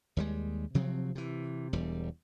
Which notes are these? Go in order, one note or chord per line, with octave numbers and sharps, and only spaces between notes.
D#2 G3 G#3
C3 F3 F#3 C4
C3 E3
E1 E2 G3